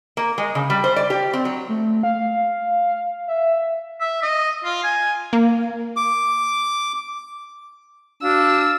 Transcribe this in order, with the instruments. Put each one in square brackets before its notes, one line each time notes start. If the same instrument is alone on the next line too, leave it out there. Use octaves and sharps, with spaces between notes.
[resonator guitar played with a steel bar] A#3
G#3
C#3
G3
C5
D5
G4
C4
F#3
[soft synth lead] A3
F5
E5
[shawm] E5
D#5
F4
G#5
[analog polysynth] A#3
[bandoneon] D6
[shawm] D4 [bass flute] F#4 [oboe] F5 [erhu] E6